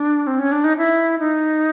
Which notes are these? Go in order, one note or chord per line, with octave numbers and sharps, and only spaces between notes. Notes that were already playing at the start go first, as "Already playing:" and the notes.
Already playing: D4
C4
C#4
D4
D#4
E4
D#4